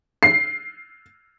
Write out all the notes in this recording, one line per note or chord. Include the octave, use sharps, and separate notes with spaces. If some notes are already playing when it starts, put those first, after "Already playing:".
C7